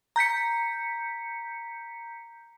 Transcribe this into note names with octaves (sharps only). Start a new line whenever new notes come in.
A#5 G6 B6 C#7